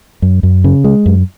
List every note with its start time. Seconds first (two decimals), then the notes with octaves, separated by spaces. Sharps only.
0.22 F#2
0.43 F#2
0.64 C#3
0.84 G#3
1.06 F#2